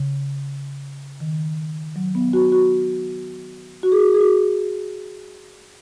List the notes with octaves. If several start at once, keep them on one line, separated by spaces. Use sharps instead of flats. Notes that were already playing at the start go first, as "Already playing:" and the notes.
Already playing: C#3
D#3
F#3
B3
F#4
F#4
F#4
G#4
F#4
G#4
F#4